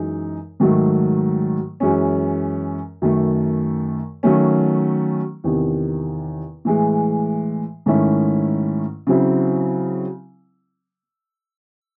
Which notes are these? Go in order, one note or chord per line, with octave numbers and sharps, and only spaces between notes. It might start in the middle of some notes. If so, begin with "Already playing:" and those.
Already playing: F#2 E3 G#3 D#4
G#2 D#3 F#3 A3
F#2 E3 G#3 C#4
F#2 D#3 A3
D#3 F#3 A3 C#4
E2 C3 D#3
A2 E3 G#3
G#2 D#3 A3 C#4 E4
C#3 F#3 C4 E4